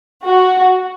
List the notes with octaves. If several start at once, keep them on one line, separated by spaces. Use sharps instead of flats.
F#4